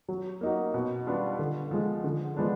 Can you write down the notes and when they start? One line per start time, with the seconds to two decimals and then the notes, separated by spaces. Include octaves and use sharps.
0.08 F#3
0.41 A#3 D#4 F#4
0.74 B2
1.07 G3 B3 D4 F4
1.39 D3
1.71 F3 G#3
2.04 D3
2.37 F3 G#3 B3 D4